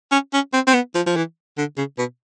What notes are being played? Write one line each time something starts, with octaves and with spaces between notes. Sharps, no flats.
C#4
C#4
C4
C4
B3
F3
F3
E3
D3
C#3
B2